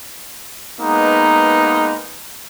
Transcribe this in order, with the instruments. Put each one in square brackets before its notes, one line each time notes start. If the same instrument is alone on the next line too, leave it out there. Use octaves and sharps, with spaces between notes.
[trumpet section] G#3 A#3 B3 D#4 B4